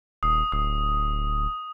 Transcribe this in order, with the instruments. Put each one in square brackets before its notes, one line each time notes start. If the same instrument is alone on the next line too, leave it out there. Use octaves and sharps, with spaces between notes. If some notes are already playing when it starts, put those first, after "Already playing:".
[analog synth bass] D#1 [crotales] D#6
[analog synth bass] D1 [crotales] D#6